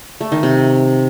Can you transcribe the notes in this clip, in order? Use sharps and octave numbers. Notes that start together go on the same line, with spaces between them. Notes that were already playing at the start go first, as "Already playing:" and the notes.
A3
D#3
C3